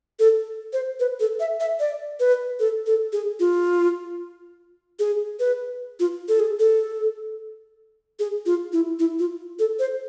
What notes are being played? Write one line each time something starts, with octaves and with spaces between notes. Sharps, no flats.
A4
C5
B4
A4
E5
E5
D5
B4
A4
A4
G#4
F4
G#4
B4
F4
A4
G#4
A4
G#4
F4
E4
E4
F4
A4
C5